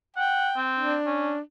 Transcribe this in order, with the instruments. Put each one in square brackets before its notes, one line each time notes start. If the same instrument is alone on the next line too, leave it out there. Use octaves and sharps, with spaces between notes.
[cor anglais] F#5 [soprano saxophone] G5
[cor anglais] C4
[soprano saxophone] D4
[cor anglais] C#4